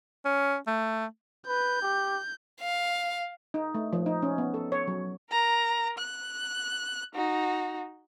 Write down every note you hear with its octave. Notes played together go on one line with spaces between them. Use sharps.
C#4
A3
B4 G6
G4
F5
D#4
A3
F3
D#4
C#4
B3
A4
C#5
F#3
A#4 A#5
F#6
D#4 F#4